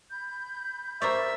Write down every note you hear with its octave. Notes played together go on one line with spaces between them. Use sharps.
B5 G6
A#4 C5 D5 E5 C#6